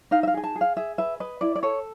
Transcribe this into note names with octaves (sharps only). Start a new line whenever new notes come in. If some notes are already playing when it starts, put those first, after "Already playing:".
D#4 F5
E5
F5
G#4 G#5
A5
G#4
F5
G#4 E5
B4 E5
B4 D#5
E4 D5
D5
A4 C#5